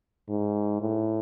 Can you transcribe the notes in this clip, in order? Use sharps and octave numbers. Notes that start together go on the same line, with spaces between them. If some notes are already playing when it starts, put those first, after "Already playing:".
G#2
A2